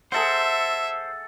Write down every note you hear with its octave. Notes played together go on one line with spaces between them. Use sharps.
G#4 A4 C5 E5 F#5